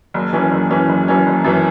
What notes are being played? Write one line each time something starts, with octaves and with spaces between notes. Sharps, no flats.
F#1
F#2 E3 C#4
F#1
F#2 E3 C#4
F#1
F#2 E3 C#4
F#1
F#2 E3 C#4